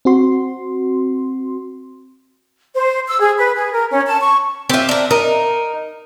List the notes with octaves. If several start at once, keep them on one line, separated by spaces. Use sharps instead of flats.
C4 F#4 C6
C5
E6
G#4
B4
G#4
A#4
C#4
A5
C#6
C4 F4 G4 E5
D4 A#4
D#4 A#4